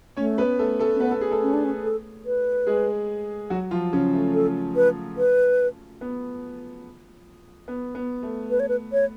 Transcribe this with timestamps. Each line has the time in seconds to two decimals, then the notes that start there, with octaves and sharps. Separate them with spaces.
0.17 A3 C#4 C#5
0.38 B3 B4
0.59 A3 A4
0.80 A3 A4
0.95 C#4
1.00 B3 B4
1.11 A4
1.21 G#4
1.31 A3 A4
1.42 C#4
1.53 D4
1.65 C#4
1.83 A4
2.26 B4
2.67 G#3 G#4
3.50 F#3 F#4
3.71 F3 F4
3.93 C#3 C#4
4.14 A3
4.34 A4
4.76 B4
5.17 B4
6.01 B3
7.68 B3
7.95 B3
8.23 A3
8.51 B4
8.60 C#5
8.69 B4
8.92 C#5